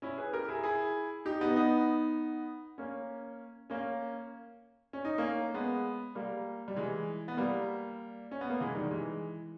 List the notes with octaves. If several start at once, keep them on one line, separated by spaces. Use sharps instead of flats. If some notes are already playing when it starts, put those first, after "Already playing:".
C#4 E4
G#4 B4
G4 A#4
E4 G#4
E4 G#4
D#4 G4
B3 D#4
B3 D#4
A#3 C#4
A#3 C#4
C#4
D#4
A#3 C#4
G#3 B3
G3 A#3
G3
E3 G#3
B3
G3 A#3
C#4
B3
A#3
E3 G#3
D#3 G3
E3 G#3